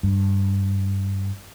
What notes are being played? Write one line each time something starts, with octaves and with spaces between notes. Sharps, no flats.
G2